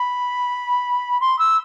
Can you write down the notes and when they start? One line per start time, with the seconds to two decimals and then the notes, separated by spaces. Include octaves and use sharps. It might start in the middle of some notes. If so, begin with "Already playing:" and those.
Already playing: B5
1.21 C6
1.39 E6